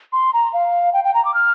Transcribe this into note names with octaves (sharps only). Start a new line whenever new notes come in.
C6
A#5
F5
G5
G5
A#5
D6
F6